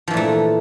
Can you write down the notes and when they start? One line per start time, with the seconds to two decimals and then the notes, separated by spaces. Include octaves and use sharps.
0.08 F3
0.11 E3
0.14 A#2
0.17 A3